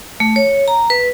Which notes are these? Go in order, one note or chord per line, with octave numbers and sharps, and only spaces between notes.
A3
C#5
A#5
B4